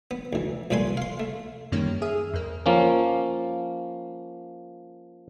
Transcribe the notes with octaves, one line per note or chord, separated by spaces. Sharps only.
B3
D2 E3
C2 A#2 A3 B4 G#5 C6
F5 C6
A3
F#2 D#3 G3 A#3 C#4
G#4 E5 D#6 F6
F2 A#3
F3 A#3 C#4